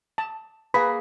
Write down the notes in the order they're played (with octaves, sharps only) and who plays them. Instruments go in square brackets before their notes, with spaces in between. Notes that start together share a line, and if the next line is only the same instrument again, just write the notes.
[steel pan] A5
[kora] A#3 G#4 [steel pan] B4 [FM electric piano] B5